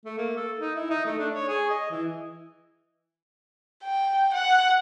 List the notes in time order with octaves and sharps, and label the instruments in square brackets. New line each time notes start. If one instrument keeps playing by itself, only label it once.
[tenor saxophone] A3
A#3
A4
D#4
E4
D#4
A3
D4
C#5
G#4
D#5
E3
[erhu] G5
F#5